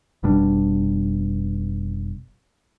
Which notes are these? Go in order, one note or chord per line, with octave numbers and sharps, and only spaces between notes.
F1 B2 G3 D4